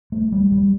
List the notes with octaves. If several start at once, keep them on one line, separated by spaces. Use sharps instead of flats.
A3
G3
G3